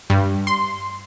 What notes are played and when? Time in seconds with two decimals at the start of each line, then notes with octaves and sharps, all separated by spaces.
0.10 G2
0.47 C6